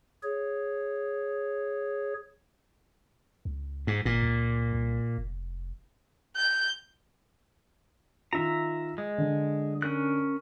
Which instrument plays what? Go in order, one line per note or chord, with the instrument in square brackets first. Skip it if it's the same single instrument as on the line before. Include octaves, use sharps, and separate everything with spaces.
[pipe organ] G#4 C#5
[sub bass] C#2
[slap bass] G#2
[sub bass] G#1 [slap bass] A#2
[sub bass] C#2
C2
F1
[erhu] G6
[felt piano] D#3 F4 [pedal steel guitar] E5 A#5
[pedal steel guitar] G#3
[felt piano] D3
[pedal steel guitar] C#4 A#4 F#6